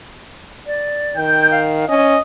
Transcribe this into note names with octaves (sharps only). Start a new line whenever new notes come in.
D5
D#3 G5 G6
F5
C#4 D#5 G#5 D#6